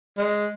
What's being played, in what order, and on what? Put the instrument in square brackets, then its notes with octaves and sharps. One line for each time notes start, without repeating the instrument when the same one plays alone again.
[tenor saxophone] G#3